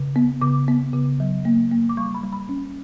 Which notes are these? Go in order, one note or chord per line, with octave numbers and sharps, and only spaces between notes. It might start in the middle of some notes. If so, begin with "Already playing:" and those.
Already playing: C#3
B3
C#3 D6
B3
C#3
F#3
A#3
A#3
D6
G3 C#6
B5
G3
B5
C#4